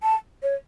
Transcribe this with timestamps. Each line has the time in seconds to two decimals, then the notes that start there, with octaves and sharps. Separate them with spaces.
0.03 A5
0.43 C#5